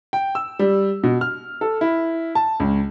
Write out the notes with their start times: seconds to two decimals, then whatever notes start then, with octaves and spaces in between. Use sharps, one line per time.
0.13 G5
0.35 E6
0.59 G3
1.03 B2
1.21 F6
1.61 A4
1.81 E4
2.35 A5
2.60 C#2